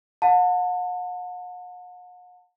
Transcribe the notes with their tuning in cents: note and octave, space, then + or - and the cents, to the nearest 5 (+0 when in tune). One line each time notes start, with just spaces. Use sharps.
F#5 -45 A5 +30